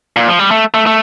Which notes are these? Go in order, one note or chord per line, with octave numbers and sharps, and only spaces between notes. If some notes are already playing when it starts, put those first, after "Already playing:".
A#2
F3
G3
A3
A3
A3